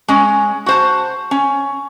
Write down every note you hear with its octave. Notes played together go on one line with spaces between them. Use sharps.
G#3 C#4
F#4 C5 A5
C#4